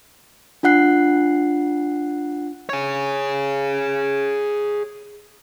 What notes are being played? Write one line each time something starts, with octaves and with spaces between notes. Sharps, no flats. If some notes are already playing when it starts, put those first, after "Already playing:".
D4 F4 F#5 F#6 C7
G#4 C#5